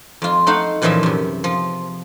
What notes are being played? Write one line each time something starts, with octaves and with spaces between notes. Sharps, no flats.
F2 F4
A3 D#4 C5 F5 F#5
F#2 A#2 E3 F3 G#4 E5
F#2 C3
F3